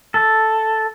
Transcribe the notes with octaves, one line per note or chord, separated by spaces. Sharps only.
A4